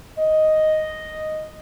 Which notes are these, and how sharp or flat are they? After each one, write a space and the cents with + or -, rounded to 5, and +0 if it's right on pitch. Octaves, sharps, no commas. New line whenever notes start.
D#5 +0